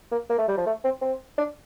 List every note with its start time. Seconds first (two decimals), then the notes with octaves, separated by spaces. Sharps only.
0.12 A#3
0.30 A#3
0.39 A3
0.48 G3
0.57 F3
0.66 A3
0.84 C4
1.02 C4
1.38 D4